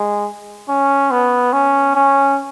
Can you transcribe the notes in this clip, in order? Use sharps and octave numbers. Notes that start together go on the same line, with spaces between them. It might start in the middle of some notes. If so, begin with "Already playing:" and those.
Already playing: G#3
C#4
B3
C#4
C#4